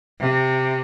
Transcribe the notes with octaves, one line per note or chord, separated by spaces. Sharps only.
C3